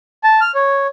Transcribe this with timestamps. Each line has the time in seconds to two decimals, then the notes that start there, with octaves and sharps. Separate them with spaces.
0.24 A5
0.41 F6
0.55 C#5